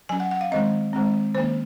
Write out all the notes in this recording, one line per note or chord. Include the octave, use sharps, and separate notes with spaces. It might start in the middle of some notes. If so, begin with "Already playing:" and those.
F#3 C#4 G#5
F#5
F#5
F5
D#3 G#3 C4 D#5
D#3 G#3 C4
D#3 A#3 C#4 C5